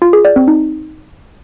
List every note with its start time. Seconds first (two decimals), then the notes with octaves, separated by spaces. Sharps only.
0.02 F4
0.13 G#4
0.25 D5
0.36 C4
0.48 D#4